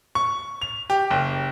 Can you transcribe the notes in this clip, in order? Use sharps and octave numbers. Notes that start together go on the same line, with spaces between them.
C#6
F7
G4
F#1